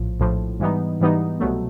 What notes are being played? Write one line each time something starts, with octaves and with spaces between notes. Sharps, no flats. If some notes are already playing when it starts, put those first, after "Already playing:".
Already playing: A#1 A2 F3
A#1 A2 F3
G#2 E3 G3 B3 D#4
G#2 E3 G3 B3 D#4
C2 B2 F#3 A3